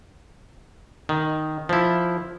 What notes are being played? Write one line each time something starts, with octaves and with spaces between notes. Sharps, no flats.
D#3
F3 E4